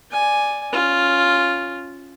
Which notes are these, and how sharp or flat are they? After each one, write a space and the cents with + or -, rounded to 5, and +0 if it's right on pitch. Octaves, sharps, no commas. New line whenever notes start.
D5 +0 G#5 +0
C#4 +0 F4 +0